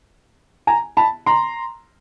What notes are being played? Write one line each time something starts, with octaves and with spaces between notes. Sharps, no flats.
G#5 A#5
A5 B5
A#5 C6